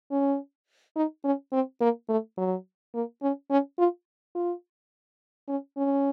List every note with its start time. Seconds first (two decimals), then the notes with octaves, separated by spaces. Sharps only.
0.11 C#4
0.96 D#4
1.24 C#4
1.53 C4
1.81 A#3
2.09 A3
2.37 F#3
2.94 A#3
3.22 C#4
3.50 C#4
3.78 F4
4.35 F4
5.48 C#4
5.77 C#4